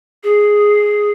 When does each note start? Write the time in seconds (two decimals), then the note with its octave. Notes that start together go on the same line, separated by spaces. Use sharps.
0.24 G#4